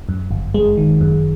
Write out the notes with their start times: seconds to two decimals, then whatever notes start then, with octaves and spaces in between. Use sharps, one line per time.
0.09 F#2
0.31 G1
0.54 G#3
0.77 D#3
1.01 F#2